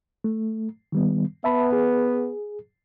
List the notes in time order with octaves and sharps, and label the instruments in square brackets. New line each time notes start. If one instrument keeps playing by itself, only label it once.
[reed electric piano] A3
D#3 G3 B3
[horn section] B3 [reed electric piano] E5 A5 B5
[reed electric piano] G#4